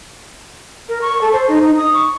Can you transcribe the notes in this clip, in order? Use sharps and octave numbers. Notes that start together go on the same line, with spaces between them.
A#4
C#6
A4
C5
D#4
D#4
D#6
C#6